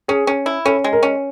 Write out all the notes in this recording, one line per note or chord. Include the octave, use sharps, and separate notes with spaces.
C#4 G#4
C#4
E4
C#4 A4
G#3
A#4
C#4